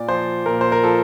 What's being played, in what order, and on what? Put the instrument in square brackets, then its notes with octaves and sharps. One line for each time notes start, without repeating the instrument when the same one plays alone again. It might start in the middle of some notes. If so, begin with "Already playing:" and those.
Already playing: [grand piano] A#2 D5
F3 C5
A#2 A#4
C5
A#4
F3 A4